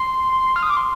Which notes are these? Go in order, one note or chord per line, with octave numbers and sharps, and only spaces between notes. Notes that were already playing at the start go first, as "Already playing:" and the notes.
Already playing: C6
F6
D#6
D6
C6